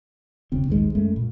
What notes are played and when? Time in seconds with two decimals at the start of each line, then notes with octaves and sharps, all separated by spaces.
0.52 E1 C#3 C4
0.67 A#1 D#2 G#2 G#3
0.95 F#2 G#3 A3
1.16 A#2